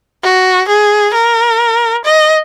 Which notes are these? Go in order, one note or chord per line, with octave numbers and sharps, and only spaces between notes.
F#4
G#4
A#4
D#5